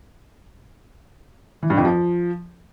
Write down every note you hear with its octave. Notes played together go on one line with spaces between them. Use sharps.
E3
G2
F2
F3